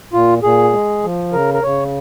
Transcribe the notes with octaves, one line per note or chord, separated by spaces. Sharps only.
A#2 F4
A#2 G#4
G#3
F3
C#3 A#4
A#4
C#3 C#5